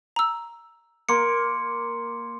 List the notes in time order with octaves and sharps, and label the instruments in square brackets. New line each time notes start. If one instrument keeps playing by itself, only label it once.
[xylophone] A#5 E6
[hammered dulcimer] A#3 [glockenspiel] C6 C#7